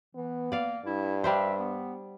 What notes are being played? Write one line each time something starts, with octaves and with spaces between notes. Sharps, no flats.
E3 B3
A#3 D5 F5
G2 E4
G3 D4 C5 E5
B3